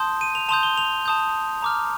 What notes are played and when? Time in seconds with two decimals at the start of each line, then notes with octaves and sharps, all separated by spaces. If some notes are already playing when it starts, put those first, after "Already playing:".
Already playing: A5 C6 D#6 G6
0.21 D#7
0.35 F7
0.49 A5 C6 D#6 G6 F7
0.63 G7
0.78 F7
1.05 A5 D#6 G6
1.62 A#5 D6 F6